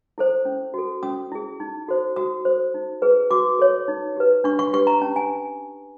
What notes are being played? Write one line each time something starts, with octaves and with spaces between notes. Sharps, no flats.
E4 A4 C5
C#4
F#4 A4
C#4 D#6
E4 G#4
D#4
F#4 A4 C5
F#4 D#6
A4 C5
D#4
G#4 B4
F#4 D6
A4 C#5
D#4
G4 B4
D4 C#6
C#6
G4 B4 C#6
A#5
C#4 A5
G#5